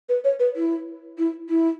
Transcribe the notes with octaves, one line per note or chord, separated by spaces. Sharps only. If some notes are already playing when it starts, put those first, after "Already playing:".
B4
C#5
B4
E4
E4
E4